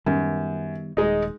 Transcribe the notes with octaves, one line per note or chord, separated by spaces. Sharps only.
F#2 D#3 G3 B3
D#1 G#3 D#4